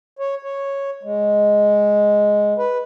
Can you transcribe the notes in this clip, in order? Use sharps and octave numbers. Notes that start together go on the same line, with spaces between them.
C#5
C#5
G#3
B4